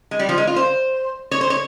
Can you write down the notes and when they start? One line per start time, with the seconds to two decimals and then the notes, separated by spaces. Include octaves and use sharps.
0.11 G#3
0.19 G3
0.29 F3
0.38 G#3
0.47 F4
0.56 C5
1.31 C#5
1.41 C5
1.50 C#5